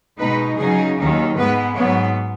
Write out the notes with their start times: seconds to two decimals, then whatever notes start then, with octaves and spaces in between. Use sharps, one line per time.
0.18 B2 G#3 D#4 B4
0.57 C#3 F#3 D#4 G#4
0.97 D#2 D#3 F#3 D#4
1.35 G#2 G#3 B3 B4
1.74 G#2 F#3 B3 C#5